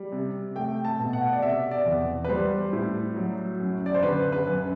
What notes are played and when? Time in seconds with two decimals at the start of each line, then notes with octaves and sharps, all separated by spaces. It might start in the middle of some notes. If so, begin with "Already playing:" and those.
Already playing: G3
0.12 C3
0.55 A3 G5
0.84 A5
0.99 B2
1.13 F#5
1.33 D5
1.42 C3 E5
1.71 D5
1.86 E2
2.24 B4
2.29 G3 C5
2.73 A2
3.16 F#3
3.60 F#2
3.86 D5
3.94 C5
4.03 D3 B4
4.32 B4
4.47 F#2